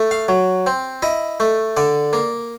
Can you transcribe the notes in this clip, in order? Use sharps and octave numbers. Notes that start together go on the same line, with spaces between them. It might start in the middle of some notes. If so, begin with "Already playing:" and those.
Already playing: A3
F5
F#3
C4
E4 D#5
A3
D3 D5
A#3